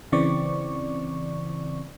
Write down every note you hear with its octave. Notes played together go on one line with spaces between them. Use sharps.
C#3 E3 C4 D5 C#6